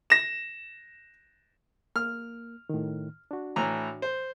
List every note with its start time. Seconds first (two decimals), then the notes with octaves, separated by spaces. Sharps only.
0.10 A#6 E7
1.96 A#3 F6
2.69 A2 D#3
3.31 D4 F#4
3.56 A2 E3 A#5
4.02 C5